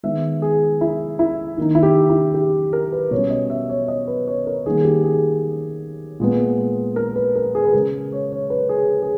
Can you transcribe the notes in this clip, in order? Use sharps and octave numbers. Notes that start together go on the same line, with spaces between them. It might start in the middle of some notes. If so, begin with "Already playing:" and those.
D#3 G#3 B3 E5
G#4
E4
E4
D#3 A#3 D#4
E4
G4
E4
G4
A#4
B4
B2 G3 C#4 C#5
D#5
E5
C#5
D#5
B4
C#5
A#4
D#3 G3 A#3 G#4
G4
G#4
A#2 G#3 B3
A#4
B4
A#4
G#4
B4
C#3 G#3 C#4 A#4
C#5
C#5
B4
G#4
G#4